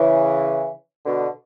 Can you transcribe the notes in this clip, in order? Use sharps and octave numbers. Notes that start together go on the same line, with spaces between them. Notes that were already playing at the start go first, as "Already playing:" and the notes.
Already playing: C#3 E3
B2 D3